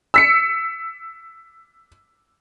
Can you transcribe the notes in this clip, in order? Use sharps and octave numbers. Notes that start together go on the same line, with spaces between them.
E6 B6 C#7